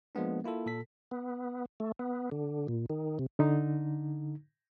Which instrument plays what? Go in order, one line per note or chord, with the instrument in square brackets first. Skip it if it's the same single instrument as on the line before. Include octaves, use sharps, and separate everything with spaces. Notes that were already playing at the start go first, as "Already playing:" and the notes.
[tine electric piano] F3 G#3 A#3 B3 D4
A#3 E4 F4 A4
A#2 A4 B6
[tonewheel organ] B3
A3
B3
D3
A#2
D#3
C3
[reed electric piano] D3 D#4